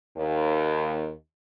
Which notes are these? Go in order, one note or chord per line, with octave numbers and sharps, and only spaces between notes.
D#2